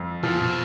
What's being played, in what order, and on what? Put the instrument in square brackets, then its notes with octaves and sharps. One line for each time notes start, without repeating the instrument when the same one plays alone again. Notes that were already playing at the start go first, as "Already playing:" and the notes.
Already playing: [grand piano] F2
[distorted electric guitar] B2 [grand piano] F3
[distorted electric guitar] A#2
B2